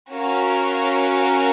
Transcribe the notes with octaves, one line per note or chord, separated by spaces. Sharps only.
C#4 F#4 A#4 C#5 F5